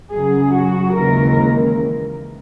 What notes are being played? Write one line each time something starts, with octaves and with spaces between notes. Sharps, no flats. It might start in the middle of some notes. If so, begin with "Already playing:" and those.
F#2 C#3 F#3 G#4
F#4
D#2 C#3 E3 G#3 A#4